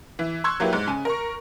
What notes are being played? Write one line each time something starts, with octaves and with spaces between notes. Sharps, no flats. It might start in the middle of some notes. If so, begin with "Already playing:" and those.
E3
C6 C#6 E6 F#6 G#6
F#3 A#3 E4 G4 B4
G#2
C#3 G#5
A#4 C#6